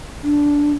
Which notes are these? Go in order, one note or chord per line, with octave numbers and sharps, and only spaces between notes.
D4